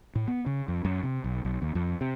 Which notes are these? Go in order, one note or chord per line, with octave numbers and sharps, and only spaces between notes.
A2
B3
C#3
F2
F#2
C3
B1
B1
D#2
F2
C3